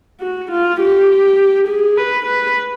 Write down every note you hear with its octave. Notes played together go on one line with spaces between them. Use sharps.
F#4
F4
G4
G#4
B4
B4